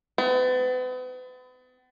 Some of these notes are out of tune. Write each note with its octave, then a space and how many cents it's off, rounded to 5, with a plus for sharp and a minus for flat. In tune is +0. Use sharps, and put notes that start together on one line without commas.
B3 +40